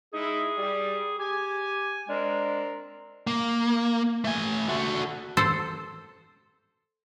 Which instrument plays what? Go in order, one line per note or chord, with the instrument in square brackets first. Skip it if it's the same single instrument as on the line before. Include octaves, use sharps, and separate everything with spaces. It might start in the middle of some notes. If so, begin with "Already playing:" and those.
[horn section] G#3 D#4 E4 [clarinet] G#4
[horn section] G3
[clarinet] G4 [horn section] G#5
[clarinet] G#3 [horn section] C4 D4 A#4
[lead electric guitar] A#3
A3 G#5
F#4 A4
[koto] A4 C5